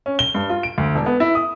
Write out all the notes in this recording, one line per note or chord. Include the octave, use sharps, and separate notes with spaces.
C#4
G7
G2
F4
D7
D2
E1
B3
E4
D#6